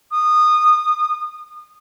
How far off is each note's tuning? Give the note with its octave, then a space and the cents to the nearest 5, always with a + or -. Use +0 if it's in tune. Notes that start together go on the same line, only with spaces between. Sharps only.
D#6 -20